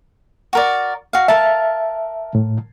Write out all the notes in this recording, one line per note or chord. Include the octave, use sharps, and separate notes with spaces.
F#4 A#4 D5
F#4 F5
A#4 E5 F5 A5
A2